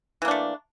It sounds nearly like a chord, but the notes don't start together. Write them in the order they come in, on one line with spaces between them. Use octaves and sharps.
E3 A#3 D4 A3